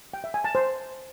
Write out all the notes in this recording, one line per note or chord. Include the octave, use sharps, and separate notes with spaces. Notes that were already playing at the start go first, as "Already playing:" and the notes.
G5
E5
G#5
A5
C5